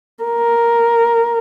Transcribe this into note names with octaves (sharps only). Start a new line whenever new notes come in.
A#4